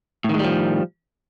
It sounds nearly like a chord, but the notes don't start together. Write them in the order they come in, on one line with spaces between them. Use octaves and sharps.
A2 D#3 G#3 G3 F3